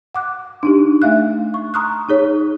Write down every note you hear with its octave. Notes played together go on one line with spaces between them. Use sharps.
F#5 D6 F#6
D4 D#4 G4
A3 E5 F5 F#6
C#6
A#5 C6 C#6 D#6 F6 F#6
D#4 G#4 C#5